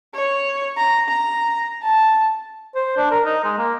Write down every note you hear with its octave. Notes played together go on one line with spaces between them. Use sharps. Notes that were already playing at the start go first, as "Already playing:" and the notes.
C#5
A#5
A#5
A5
C5
D4
A#4
D#4
G#3
A#3